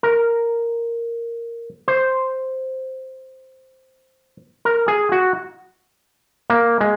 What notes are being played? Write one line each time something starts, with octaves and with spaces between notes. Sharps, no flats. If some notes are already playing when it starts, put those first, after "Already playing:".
A#4
C5
A#4
G#4
F#4
A#3
G#3